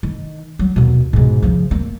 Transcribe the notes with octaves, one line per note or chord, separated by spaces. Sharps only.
D#3
F#3
D#2 B2
G#2 B2
C#3 F3
A#3